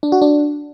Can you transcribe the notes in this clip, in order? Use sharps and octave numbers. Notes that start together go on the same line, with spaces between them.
D4
F#4
D4